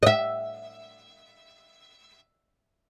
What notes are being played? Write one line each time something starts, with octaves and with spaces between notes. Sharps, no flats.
D#5 E5